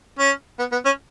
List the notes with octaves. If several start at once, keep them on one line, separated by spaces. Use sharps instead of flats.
C#4
B3
B3
C#4